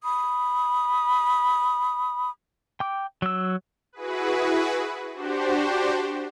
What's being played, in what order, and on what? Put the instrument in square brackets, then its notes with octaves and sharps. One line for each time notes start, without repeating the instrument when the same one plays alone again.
[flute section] B5 D#6
[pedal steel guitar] G5 D6
F#3 E6
[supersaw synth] E4 F#4 G#4 B4
D4 F#4 G4 C5